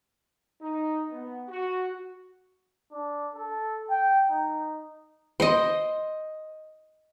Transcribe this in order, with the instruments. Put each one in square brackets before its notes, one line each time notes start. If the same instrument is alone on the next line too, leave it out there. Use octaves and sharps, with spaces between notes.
[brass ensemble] D#4
B3
F#4
[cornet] D4
A4
G5
D#4
[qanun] C5 D#5